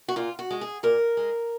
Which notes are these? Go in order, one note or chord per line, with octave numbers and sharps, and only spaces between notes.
F#4
A#2 F4
F#4
G#3
G#4
A#2 A#4
G#3